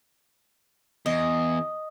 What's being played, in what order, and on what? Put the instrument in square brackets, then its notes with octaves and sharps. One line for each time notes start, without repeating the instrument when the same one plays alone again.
[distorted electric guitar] E2 [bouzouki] D#5